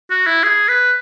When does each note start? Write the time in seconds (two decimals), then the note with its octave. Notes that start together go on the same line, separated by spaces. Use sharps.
0.10 F#4
0.27 E4
0.44 G#4
0.68 B4